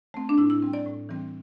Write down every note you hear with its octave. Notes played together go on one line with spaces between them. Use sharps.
A3 C4
D4
A2 E4
E4
G3 C4
D5
A2
E3 G3 C4